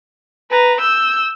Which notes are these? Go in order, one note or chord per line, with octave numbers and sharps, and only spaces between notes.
B4 A#5
E6 G6